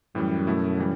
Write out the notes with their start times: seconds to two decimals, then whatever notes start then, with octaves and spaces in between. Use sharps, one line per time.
0.15 F#2 A2 E3 G3
0.47 B2 A3 E4
0.80 C#3 E3 G3